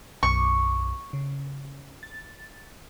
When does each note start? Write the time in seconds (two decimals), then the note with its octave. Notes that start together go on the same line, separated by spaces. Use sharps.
0.23 B1 F#2 C#6 D6
1.13 C#3
2.03 A6